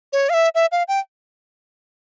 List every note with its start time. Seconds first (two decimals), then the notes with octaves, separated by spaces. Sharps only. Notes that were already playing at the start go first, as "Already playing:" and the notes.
0.13 C#5
0.29 F5
0.34 E5
0.55 E5
0.72 F5
0.88 G5